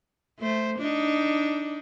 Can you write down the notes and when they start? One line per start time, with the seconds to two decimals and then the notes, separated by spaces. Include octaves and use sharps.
0.40 A3 C5
0.78 D4 D#4